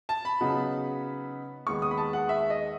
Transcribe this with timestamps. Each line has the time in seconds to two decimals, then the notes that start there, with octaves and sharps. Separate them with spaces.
0.09 A5
0.25 B5
0.40 C#3 F#3 B3 D#4
1.67 D#2 D#3 G#3 B3 D#4 C#6
1.82 D#6
1.91 B5
1.98 A5
2.13 F#5
2.29 E5
2.50 D#5